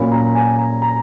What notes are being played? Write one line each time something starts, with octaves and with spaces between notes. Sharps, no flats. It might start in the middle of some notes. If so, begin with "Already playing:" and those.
Already playing: A#2 F#3 A#3 C#4 B5
A#5
G#5
A#5
A#5